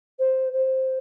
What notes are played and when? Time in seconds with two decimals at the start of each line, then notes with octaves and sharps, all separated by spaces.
0.19 C5
0.52 C5